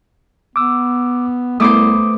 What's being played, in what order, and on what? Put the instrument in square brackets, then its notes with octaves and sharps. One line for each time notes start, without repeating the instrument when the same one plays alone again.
[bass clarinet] B3 [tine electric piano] D6 E6
[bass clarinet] C2 [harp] A3 B3 C5 [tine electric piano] D6 D#6